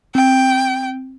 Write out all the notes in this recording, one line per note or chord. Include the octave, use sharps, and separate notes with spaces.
C4 G5